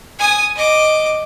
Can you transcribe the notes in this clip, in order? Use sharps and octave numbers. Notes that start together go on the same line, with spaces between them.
G#5 D#6
D#5 D6